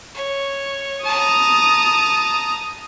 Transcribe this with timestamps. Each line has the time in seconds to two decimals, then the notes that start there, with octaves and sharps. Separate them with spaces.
0.15 C#5
1.05 A5 A#5 D#6